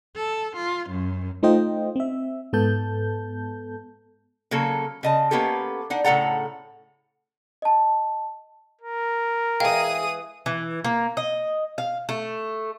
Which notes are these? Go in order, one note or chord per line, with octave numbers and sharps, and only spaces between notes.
A4
F4
F#2
A3 D#4 F4 C5 D#5 G5
C4 E5
G#2 B3 A4 A5 G6
C#3 F#3 A#3 A4
C#3 D#5 A5
A#3 B3 C#4 G4 A4
D4 D#4 F#5
A2 C#3 A4 F#5 A#5
D#5 A5
A#4
E3 G#3 G#4 F5 G5 D#6
E3
A#3
D#5
F5
A3